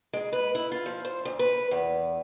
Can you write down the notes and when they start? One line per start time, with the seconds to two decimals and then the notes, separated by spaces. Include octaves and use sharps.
0.13 G#3
0.33 B4
0.55 E4
0.72 F4
0.86 F3
1.05 C5
1.25 D2
1.39 B4
1.71 E2